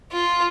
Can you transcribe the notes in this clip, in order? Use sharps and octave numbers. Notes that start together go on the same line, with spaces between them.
F4